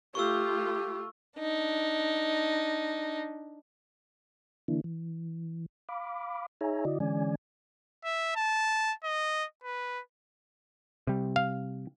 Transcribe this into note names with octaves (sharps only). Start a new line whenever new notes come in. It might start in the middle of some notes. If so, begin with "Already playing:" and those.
A3 F4 G4 C#6 E6
D4 D#4
D3 E3 A#3 D4 E4
E3
F5 B5 D6
D#4 G#4 C#5 E5 G#5 A#5
D3 E4 F#4 D5 D#5
D3 E3 G#3 C#4 D5 G#5
E5
A5
D#5
B4
C3 G3
F5